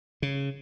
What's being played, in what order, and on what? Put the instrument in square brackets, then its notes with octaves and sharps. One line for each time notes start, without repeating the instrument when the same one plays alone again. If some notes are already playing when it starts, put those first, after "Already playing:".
[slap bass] C#3